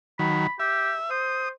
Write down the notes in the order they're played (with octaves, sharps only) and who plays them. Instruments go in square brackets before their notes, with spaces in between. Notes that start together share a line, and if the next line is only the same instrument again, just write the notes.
[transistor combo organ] D#3 F#3 [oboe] B5
[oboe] G4 [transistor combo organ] E5
[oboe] C5 [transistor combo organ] D#6